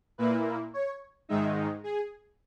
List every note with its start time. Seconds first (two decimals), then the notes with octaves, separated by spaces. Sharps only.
0.18 A#2 A#3 E4 B4
0.74 C#5
1.29 G#2 D#3 G#3 D#4 E5
1.84 G#4